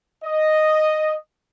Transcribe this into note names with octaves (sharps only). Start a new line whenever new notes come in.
D#5